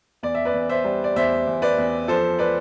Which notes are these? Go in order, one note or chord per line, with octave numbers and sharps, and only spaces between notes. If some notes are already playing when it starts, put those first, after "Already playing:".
E2 D5
E5
B4 D5
E2
C5 E5
G3
D5
E2 C5 E5
E2
B4 D5
E2
F3 A4 C5
B4 D5